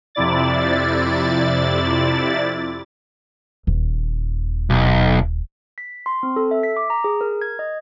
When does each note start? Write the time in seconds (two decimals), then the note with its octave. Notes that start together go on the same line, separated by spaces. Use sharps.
0.15 F2 C3 E4 D5 A6
3.67 D#1
4.70 B1
5.78 B6
6.06 C6
6.23 C4
6.36 A4
6.51 E5
6.63 B6
6.77 D6
6.90 A#5
7.04 G#4
7.21 A#4
7.42 G#6
7.59 D#5